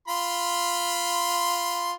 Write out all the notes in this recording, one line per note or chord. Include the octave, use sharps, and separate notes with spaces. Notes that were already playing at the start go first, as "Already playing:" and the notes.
F4 B5 C6